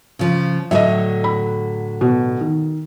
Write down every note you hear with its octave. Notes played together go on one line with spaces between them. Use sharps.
C#3 F3
A2 D3 F#3 D#5 E5
B5
B2
D#3